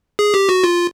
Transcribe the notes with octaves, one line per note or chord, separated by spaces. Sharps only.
G#4
G4
F#4
F4